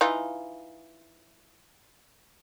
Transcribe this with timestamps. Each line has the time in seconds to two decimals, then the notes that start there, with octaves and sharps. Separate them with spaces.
0.01 E3 D#4 F4